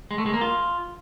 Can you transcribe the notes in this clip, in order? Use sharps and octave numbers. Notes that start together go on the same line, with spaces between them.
G#3
A3
G#3
A#3
F4